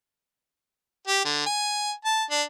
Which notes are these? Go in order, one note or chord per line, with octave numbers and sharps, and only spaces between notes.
G4
D3
G#5
A5
D4